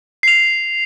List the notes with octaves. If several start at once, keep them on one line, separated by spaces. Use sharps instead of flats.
C7 F7